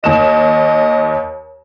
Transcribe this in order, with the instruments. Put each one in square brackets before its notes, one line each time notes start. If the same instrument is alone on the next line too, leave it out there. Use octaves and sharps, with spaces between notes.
[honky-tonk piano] D#2 E7 [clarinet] D#5